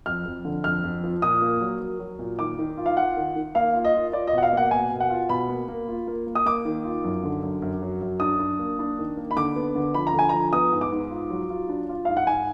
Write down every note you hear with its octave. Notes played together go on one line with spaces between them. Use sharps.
F2 F6
F2
D3
F2 F6
F2
F3
A#2 D#6
A#3
F#3
F#3
F#3
A#2
D#3 D6
D#3
F4
F5
F4 F#5
D#3
D#3
A#3 F5
F4
D#5
F4
F4 D5
D#5
B2
F#5
F5
A#3 F#5
B2 G#5
B2
F#5
F4
B2 B5
A#3
A#3
F4
A#3
A#3
D#6
A#3 D6
D#3
F4
F#2
D3
F#2
F#2
F#3
F#2
D4 D#6
D4
A#3
D4
D#3
A#3
B5
D3 D6
B3
D3
F3 B5
A#5
D3 G#5
F3 A#5
B3 D#6
G#2
D6
G#2
F4
F#3
F4
D4
F4
G#2 F5
F#5
G#2 G#5